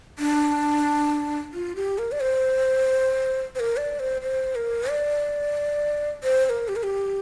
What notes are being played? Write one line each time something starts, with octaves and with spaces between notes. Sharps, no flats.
D4
F4
G4
A#4
D5
C5
C5
A#4
D5
C5
C5
A#4
D5
C5
C5
A#4
G4
A#4
G4